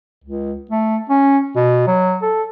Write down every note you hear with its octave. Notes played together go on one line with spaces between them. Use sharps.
C#2
A3
C#4
B2
F#3
A4